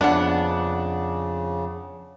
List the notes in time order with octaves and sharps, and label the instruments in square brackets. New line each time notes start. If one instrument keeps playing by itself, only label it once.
[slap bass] F2 [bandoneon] C#3 [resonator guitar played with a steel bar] B3 F#5 [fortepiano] D4